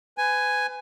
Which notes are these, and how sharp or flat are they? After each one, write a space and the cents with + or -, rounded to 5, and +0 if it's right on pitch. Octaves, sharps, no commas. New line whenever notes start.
B4 +30 G#5 +0